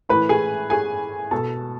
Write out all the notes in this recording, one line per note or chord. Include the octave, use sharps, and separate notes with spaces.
A2 E3 B4 B5
G#4 G#5
G#4 G#5
B2 A4 A5